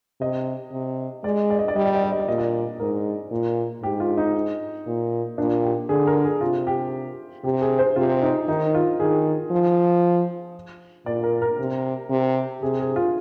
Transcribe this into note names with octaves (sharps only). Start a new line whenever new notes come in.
C3 D#5
C3
G#3 D5
D5
D#5
D5
G3 D#5
D5
D#5
D5
D#5
D5
A#2 D#5
D5
G#2 A#4
A#2
G#2 G4
F4
D#4
A#2
A#2 D4
G4
D3 G#4
A#4
G#4
C3 F4
G4
C3 G4
G#4
C5
C3 F4
D#4
D#3 D#4
F4
D#3 G#4
F3
A#2 D5
A#4
A#4
C3
C3
C3 G#4
G#4
F4